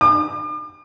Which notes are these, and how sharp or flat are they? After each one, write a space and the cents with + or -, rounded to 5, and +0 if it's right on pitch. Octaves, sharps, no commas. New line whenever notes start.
D6 +45